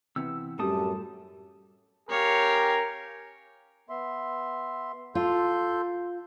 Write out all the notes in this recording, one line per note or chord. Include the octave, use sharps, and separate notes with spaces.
C3 E3 B3 E6
F#2 A2 G3 G4 A4 A5 D#6
C#4 G4 A#4 C#5 F5
B3 E5 C6
F4 A4 C6 G6